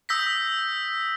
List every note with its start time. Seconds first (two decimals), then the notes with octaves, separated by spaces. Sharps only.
0.09 D#6 E6 G6 A#6 B6